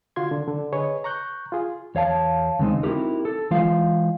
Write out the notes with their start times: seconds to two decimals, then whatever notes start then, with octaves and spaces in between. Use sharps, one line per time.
0.16 D3 F4 F#4 C6 G#6
0.31 D3
0.47 D3
0.73 G#4 B4 C#5 D#5
1.04 A#5 C#6 F#6 G6
1.52 F4 G#4
1.95 E2 C#5 F5 A5
2.59 D#2 C#3 G#3 C4 D#4
2.83 C4 D#4 E4 F#4 G4 A#4
3.25 A4
3.51 E3 G#3 F4 F5